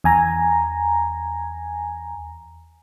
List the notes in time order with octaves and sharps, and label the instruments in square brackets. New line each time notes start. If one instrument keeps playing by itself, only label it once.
[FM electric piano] E2 G#5 A#5